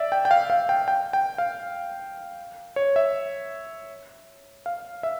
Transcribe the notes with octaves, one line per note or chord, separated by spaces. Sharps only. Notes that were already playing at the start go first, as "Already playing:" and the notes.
Already playing: D5 E5
G5
G5
F5
F5
G5
G5
G5
F5
C#5
E5
F5
E5